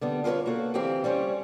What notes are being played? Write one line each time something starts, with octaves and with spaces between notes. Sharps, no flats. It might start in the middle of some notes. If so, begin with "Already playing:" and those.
D3 G3 B3
F4 G4 A#4 B4 C#5
A#3 F#4 A4
D2 E3 C4 G4 F5
G3 C#4 C5 C#5